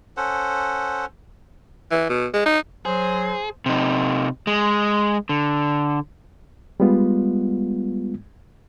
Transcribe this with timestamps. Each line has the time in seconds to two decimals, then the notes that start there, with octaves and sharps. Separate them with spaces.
0.17 C#4 A4 C5 F#5
1.92 E3
2.09 B2
2.34 G#3
2.46 D#4
2.85 F#3 G#4 C5
3.66 C3 D#4
4.47 G#3
5.29 D3
6.80 G3 G#3 B3 F4